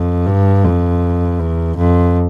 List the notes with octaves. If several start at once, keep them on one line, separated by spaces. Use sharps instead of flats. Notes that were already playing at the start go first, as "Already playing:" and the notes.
Already playing: F2
G2
F2
E2
F2